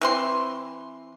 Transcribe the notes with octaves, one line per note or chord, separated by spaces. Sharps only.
E3 C4 C6